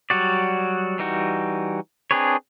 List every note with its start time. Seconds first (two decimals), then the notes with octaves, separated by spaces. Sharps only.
0.10 F#3 G3 F#4 D5
0.99 E3 G3 D#4 F#4
2.11 C4 D4 G#4 B4 C#5